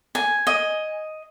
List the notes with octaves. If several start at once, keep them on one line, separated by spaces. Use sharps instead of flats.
G#5
D#5